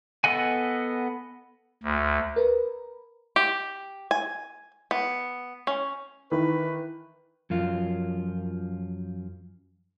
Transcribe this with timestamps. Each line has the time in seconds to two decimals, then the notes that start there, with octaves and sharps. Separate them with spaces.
0.24 B3 A4 D#5 F#5 G#5
1.83 D2
2.36 A#4 B4
3.36 G4
4.11 G#5
4.91 B3
5.67 C#4
6.32 D#3 E3 B4
7.50 F#2 F3 F4